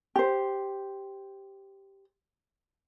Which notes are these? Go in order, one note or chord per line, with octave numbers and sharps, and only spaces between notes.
G4 C5